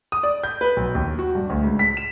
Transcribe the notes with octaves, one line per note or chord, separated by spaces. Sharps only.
D#6
D5
G6
B4
B1
D#2
F#4
G2
D2
C#2
B6
E7